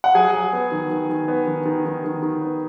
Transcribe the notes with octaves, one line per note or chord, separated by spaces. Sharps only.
F#5
F#3 G#4 G#5
F#3
B3
D#3
D#3
D#3
B3
D#3
D#3
D#3
D#3
D#3
B3